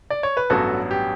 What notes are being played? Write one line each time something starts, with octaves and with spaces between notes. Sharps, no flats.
D5
C#5
B4
A1 G2 F#3 B3 F#4 A4
G4